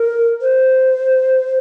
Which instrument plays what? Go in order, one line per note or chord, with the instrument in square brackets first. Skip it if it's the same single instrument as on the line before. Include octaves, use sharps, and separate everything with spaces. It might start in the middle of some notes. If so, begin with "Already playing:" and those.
Already playing: [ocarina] A#4
C5